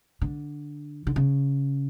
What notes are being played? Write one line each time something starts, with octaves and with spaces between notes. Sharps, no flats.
D3
D3
C#3